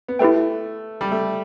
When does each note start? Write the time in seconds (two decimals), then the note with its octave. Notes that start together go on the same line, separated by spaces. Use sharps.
0.08 B3
0.19 A3 E4 G4 B4 G5
1.01 G3
1.12 A3